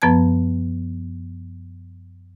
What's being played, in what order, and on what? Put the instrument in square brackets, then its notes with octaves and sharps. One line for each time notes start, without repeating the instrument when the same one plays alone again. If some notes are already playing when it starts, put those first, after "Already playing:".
[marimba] F#2 F3 B3 B4 A5 G#6